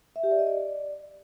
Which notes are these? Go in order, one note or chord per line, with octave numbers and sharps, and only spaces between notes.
E5
G4
D5
D#5
D5